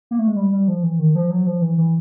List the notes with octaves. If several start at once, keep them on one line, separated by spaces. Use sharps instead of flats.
A#3
A3
G#3
G3
G3
F3
E3
D#3
F3
F#3
F3
E3
E3